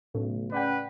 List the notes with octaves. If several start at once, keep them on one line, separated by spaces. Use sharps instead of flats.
B1 A2 C#3 A3
C#3 B4 D5 F#5 G5